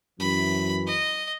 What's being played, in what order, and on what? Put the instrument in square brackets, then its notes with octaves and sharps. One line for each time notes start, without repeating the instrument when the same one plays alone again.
[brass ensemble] F#2 E3 [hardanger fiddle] B5
[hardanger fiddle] D#5